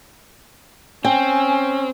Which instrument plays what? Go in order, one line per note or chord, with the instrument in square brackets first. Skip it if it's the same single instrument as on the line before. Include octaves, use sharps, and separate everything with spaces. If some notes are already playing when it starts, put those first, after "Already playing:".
[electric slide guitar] C4 [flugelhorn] C#4 [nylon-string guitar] G5 [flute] G#5